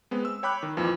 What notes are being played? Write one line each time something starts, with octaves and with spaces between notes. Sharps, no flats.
G#3 B3 C4
E6
C#5 G5 B5 D6 F#6
D#3
F2 A#2 E3 F3